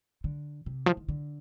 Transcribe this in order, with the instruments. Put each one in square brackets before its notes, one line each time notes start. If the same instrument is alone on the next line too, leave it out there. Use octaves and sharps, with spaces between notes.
[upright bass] D3
C3
F3
D#3
D3